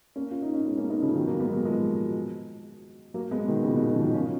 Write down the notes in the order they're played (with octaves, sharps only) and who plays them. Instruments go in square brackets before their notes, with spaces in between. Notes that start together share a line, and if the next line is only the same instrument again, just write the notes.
[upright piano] A#3 C#4
F4
D#4
C#4
G#3 B3
A#3 C#4
B3 D#4
C#3 F3
D#3 F#3
F#3 A#3
G#3 B3
F#3 A#3
F3 G#3
F#3 A#3
G#3 B3
B2 D#3
A#2 C#3
B2 D#3
C#3 F3
D#3 F#3
C#4 F4